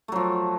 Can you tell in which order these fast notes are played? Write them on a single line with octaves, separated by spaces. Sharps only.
A3 F#3 F3